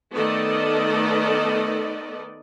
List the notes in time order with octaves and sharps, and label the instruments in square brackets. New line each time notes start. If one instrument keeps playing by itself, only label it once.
[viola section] D#3 A3 B3 A4 D5 D#5